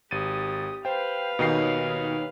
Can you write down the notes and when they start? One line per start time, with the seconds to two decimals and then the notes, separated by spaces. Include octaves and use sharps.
0.11 G#1 G4 D#6 A6 D#7
0.85 B4 C5 F5 G5
1.39 D#2 B2 D#4 A#4 C7